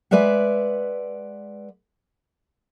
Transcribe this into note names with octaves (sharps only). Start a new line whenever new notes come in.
G#3 B4 D5 E5 F#5